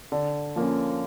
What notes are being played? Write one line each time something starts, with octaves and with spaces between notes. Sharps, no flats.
D3
F3 A#3 C#4